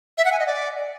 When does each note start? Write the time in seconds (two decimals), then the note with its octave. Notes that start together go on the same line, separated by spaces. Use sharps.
0.18 E5
0.25 F#5
0.32 G#5
0.39 D#5
0.47 D5